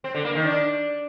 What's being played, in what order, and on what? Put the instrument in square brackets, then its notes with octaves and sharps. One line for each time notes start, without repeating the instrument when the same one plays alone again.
[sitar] C4
D3
A#3
D#3
D4